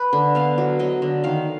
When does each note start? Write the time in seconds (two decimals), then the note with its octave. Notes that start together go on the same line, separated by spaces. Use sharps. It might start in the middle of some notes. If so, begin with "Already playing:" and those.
Already playing: B4
0.13 D3
0.35 B3 F5
0.58 F#3
0.79 F#3 D#5
1.02 D3
1.24 D#3 F5